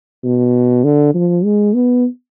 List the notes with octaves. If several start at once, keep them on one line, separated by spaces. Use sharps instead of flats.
B2
D3
F3
G#3
B3